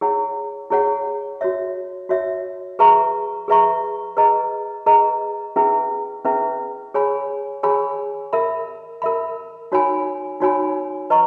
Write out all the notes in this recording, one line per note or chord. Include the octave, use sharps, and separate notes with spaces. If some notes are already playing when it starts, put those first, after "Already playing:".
E4 G#4 C#5 F#5
E4 G#4 C#5 F#5
F#4 C#5 E5
F#4 C#5 E5
G#4 B4 E5 A#5 C#6
G#4 B4 E5 A#5 C#6
G#4 B4 D#5 A#5
G#4 B4 D#5 A#5
C#4 E4 G#4 B4 E5
C#4 E4 G#4 B4 E5
G#4 C#5 G#5 B5
G#4 C#5 G#5 B5
A#4 E5 B5
A#4 E5 B5
D#4 F#4 C#5 G#5 B5
D#4 F#4 C#5 G#5 B5
B4 D#5 A#5 C#6